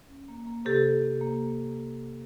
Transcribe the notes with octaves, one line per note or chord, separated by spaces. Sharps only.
C#4
A#3
A#3
C3 G4 A4
C3
C3
A#3